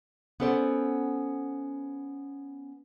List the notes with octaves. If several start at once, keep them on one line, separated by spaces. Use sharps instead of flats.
B3 C#4 A4 C5 D5